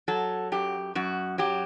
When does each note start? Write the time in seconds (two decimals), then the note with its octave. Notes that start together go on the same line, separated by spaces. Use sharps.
0.08 F#3 A4
0.52 F#2 G4
0.95 F#2 F#4
1.38 F#3 G4